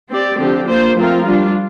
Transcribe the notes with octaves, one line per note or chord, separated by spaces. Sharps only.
C4 G4 D5
D3 F3 C4 G4
A#3 F4 C5
F3 A3 C4 F4 A#4
G3 D4 F4